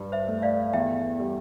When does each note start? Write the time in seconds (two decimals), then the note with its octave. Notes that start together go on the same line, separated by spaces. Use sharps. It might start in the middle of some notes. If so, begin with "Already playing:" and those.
Already playing: G2
0.12 C5 E5
0.28 A3
0.42 D5 F5
0.73 E2 E5 G5
1.20 G3